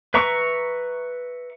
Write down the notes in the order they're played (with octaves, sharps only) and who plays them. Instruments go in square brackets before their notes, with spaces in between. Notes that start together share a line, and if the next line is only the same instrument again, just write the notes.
[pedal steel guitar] B4 E5 A#5 C#6